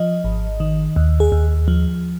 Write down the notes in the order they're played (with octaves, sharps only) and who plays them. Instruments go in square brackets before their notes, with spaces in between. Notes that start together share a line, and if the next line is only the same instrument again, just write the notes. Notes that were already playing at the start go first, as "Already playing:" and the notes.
Already playing: [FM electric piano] F3 D#5
G#1
D#3
D#2
G#4
D#2
F3